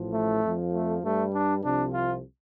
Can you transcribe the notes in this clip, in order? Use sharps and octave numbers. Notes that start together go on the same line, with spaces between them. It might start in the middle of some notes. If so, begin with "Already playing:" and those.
Already playing: A1 A2 F3
A3
F2 F3
A3
G2 G3 A3
D4
C2 C3 F3 D4
F4